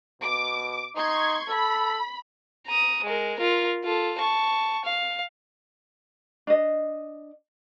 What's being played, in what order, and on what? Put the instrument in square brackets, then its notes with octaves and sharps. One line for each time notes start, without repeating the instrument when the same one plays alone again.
[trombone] B2 [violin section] D6
[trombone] D#4 [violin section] C6 C#6 G#6
[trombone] A4 [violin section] B5
[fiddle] A#5 D#6
G#3 A#4
F4 A#4
F4 A4
A5 C#6
F5
[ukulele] D4 D#5